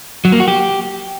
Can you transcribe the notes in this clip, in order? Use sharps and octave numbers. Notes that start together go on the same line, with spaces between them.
F#3
A#3
F#4
G4